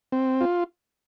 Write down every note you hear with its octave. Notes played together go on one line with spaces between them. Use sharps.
C4
F4